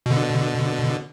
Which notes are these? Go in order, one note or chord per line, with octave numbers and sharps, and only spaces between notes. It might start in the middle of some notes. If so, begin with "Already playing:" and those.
B2 D3